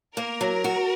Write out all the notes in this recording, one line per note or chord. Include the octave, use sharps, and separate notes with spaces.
A#3 A#4
F#3
F#4